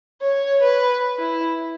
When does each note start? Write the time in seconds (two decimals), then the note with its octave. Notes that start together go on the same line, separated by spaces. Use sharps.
0.21 C#5
0.63 B4
1.19 E4